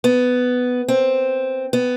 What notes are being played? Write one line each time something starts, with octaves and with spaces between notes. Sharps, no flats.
B3
C4
B3